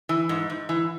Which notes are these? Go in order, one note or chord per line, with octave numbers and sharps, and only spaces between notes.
E3
G#2
G#2
E3